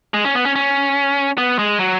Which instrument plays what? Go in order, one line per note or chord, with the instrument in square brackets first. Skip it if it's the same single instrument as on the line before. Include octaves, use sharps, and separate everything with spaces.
[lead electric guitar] G#3
C#4
B3
C#4
C#4
B3
G#3
F#3